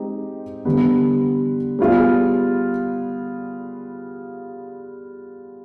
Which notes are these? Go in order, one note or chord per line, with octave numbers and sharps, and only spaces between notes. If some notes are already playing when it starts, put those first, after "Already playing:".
Already playing: G#3 C4 D#4 G4
D3 G3 B3
G3 B3 F4 G#4